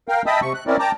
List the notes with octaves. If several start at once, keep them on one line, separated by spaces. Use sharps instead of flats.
A#4 F5 G5
D#5 E5 G5 A5 B5 D#6
C3 C#6
F#6
C4 C#4 E4 A#4 D5
G5 A5 A#5 D6